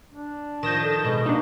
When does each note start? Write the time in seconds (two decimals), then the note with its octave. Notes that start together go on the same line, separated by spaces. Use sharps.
0.11 D4
0.63 D#3 F3 G6 A#6 E7
0.83 A4
1.05 B2 G#3
1.26 A#3 D4 D#4